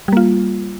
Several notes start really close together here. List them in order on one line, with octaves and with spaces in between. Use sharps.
G3 A#3 F4